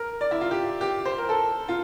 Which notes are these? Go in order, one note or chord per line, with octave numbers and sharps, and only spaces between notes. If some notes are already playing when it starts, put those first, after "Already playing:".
Already playing: A#4
D5
E4
F4
G4
G4
C5
A#4
A4
F4